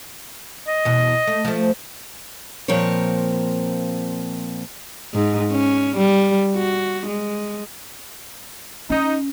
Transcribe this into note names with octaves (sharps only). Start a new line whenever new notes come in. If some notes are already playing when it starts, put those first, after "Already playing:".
D#5
E2 B2
A3
F3 A3
A#2 F3 C4 A#4 C#5
G#2
C#4
G3
F#4
G#3
C#4 D#4